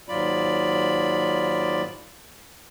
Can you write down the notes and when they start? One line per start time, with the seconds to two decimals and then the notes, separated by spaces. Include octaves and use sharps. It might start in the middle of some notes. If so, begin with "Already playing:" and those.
0.09 D#2 G#2 F#3 F4 D5 B5